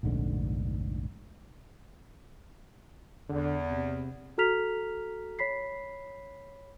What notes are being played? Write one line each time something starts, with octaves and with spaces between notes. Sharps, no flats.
F1 A#1 G#2 D3
E2 D3
C3
F#4 A4 A#5 F6 B6 F7
C#5 B5 B6 C7